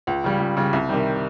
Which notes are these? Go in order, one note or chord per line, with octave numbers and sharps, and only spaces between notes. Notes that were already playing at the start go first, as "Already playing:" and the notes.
C#2
C#3 G3
C#2
C#3 G3
C2
C3 D#3 G3